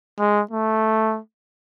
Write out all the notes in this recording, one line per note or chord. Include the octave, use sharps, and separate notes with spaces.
G#3
A3